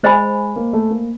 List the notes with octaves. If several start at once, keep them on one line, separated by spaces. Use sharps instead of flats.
G#3 C5 D#5 G#5 B5
A#3
A3
A#3